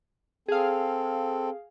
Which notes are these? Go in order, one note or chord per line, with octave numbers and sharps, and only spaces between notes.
C4 G#4 A4 F5